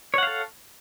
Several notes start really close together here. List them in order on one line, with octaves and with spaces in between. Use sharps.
C#5 F#5 F5 A4